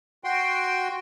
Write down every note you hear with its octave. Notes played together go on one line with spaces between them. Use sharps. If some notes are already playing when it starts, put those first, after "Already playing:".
F#4 G5 C6